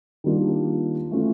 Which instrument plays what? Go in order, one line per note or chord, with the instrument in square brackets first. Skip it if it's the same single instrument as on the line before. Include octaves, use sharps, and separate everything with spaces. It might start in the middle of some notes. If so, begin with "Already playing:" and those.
[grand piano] D#3 G3 A#3 D4 F4
E3 A3 C#4 F4